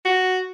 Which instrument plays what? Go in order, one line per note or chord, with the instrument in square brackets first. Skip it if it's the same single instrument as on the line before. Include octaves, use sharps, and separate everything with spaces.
[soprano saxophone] F#4